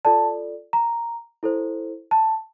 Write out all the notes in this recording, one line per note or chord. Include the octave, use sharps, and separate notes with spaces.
F4 A4 D5 A5
A#5
E4 A4 C5
A5